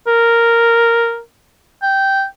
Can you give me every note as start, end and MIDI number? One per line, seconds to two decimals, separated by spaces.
0.07 1.19 70
1.82 2.24 79